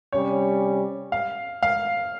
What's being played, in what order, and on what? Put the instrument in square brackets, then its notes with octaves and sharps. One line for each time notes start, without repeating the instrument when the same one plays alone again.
[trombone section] C3 G3 C#4 [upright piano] C#5
[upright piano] F5
F5